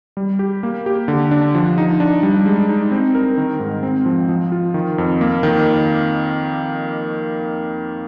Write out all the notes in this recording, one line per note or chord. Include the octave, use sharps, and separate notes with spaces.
G3
G4
A#3
G4
D3
D4
F3
D#4
D4
G3
G#3
D#4
C4
A#4
D#3
G#2
C4
F3
F3
F4
D#3
F2
A#3
D#3